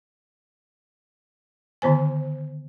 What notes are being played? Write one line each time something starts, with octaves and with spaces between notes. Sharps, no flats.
D3 D#3 B3 C5 G#5